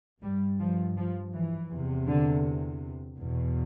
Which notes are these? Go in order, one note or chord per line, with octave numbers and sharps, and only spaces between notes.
G2 G3
F3
F3
E3
E2 C3
D3
E2 B2